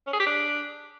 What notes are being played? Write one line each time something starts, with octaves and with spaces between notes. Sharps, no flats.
C#4
G#4
G4
D4